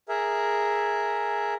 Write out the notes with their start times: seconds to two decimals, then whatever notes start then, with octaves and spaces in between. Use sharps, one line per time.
0.09 G#4 A#4 E5